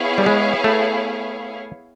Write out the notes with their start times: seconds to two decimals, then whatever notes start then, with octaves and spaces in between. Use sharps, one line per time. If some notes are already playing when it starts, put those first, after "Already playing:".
Already playing: B3 E4 G#4 C#5 F5
0.18 G3
0.26 G#3
0.64 A3